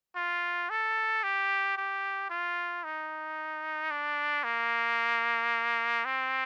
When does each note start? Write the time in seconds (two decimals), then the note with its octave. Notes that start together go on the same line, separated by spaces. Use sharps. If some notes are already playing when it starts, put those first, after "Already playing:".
0.16 F4
0.70 A4
1.23 G4
1.77 G4
2.30 F4
2.84 D#4
3.91 D4
4.44 A#3
6.05 C4